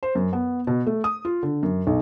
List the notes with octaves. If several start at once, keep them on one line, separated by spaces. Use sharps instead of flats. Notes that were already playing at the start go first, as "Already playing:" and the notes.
C5
F#2
B3
B2
A3
D#6
F4
D3
F#2
B1